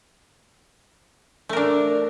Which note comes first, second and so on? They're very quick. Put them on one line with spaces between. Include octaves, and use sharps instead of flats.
A3 A#4 D4